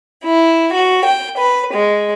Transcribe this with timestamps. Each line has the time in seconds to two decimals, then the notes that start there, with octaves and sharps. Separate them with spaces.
0.24 E4
0.72 F#4
1.05 G5
1.38 B4
1.73 G#3